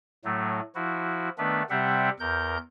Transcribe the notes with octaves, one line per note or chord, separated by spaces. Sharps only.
A2 F#3 A3
F3 E4 F#4
D#3 A3 B3 D4 B4
C3 G3 C4 G4 E5 F#5
E2 A#4 G6